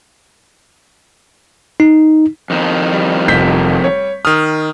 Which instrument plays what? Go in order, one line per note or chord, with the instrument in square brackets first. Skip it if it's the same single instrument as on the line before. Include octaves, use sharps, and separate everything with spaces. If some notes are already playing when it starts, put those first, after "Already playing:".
[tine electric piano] D#4
[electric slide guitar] F2 D#3
[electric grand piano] G3
[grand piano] F1 G6 B6
C#5
[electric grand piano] D#3 D#6 [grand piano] F6